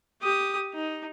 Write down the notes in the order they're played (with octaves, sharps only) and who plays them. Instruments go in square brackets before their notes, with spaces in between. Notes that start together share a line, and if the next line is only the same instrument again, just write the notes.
[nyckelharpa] G4 D#6
D#4